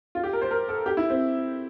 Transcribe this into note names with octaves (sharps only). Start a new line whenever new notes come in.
F4
G4
A#4
C5
A#4
A4
G4
E4
C4